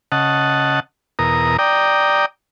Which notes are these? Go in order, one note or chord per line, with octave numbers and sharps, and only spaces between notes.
C#3 D#5 F#5 A5
E2 B2 A#4 A#5 D#6
D5 G5 A#5 D#6